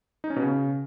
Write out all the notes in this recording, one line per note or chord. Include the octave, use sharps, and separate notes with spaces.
D#4
C#4
B2
C#3